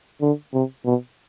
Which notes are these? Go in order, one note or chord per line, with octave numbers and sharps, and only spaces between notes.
D3
C3
B2